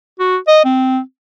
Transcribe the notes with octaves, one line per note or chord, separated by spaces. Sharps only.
F#4
D#5
C4